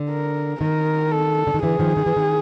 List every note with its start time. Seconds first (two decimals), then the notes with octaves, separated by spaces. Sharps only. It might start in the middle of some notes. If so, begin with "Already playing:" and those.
Already playing: D3
0.10 A#4
0.61 D#3 A#4
1.12 A4
1.47 D3
1.54 D#3
1.62 D3 E3 G#4
1.79 D#3 F3
1.97 D#3
2.06 E3
2.16 D#3